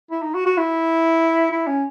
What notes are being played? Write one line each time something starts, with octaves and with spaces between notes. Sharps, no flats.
E4
D#4
F#4
F#4
E4
E4
C#4